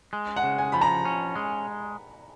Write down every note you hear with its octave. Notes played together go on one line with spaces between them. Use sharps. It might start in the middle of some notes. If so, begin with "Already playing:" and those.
G#3
F#5
C#3
G#5
F3 B5
A#5
C#4
G#3